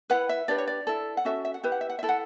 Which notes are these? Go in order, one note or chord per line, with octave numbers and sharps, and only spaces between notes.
E4 B4 F#5
E5
D4 G4 B4 D5
C#5
D5
E4 A4
F#5
C#4 F#4 A4 E5
E5
F#5
E4 G4 B4 E5
F#5
E5
F#5
E5
E4 A4
F#5